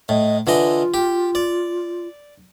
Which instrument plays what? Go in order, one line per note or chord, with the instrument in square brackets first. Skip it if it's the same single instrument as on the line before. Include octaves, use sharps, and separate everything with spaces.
[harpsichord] A2 [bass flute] D#5
[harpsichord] D3 E3 D#5 [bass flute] F4
[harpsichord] G4
D5